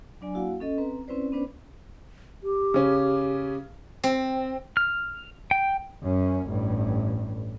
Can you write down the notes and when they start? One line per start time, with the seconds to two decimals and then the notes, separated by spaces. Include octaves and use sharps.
0.21 F#3 D4 D5 G#5
0.34 A#3 E4 F#4 F5 F#5
0.60 C#4 A4 D#5
0.78 C4 B4 A#5
1.08 C4 C#4 E4 B4 C5 D5
1.32 B3 C#4 D4 B4 C5 D5
2.43 G4
2.74 C#3 C#4
4.04 C4
4.77 F6
5.51 G5
6.03 F#2 C#4
6.48 A1 G2